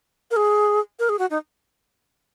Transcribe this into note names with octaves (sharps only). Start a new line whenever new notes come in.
A#4
G#4
A#4
G#4
F#4
D#4